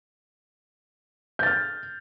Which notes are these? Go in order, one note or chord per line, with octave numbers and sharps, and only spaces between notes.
F6 G6 A6